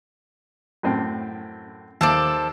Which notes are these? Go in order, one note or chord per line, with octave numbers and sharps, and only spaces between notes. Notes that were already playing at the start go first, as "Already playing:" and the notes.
F#2 A2 C4
D#2 A4 C5 D5